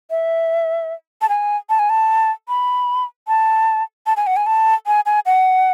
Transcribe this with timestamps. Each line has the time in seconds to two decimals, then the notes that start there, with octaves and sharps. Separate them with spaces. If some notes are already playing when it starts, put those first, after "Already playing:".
0.10 E5
1.22 A5
1.29 G#5
1.70 A5
1.79 G#5
1.90 A5
2.49 B5
3.28 A5
4.06 A5
4.17 G#5
4.27 F#5
4.36 G#5
4.46 A5
4.87 G#5
5.06 G#5
5.26 F#5